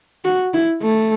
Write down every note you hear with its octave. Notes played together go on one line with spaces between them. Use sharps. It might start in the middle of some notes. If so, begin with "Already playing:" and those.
F#4
E4
A3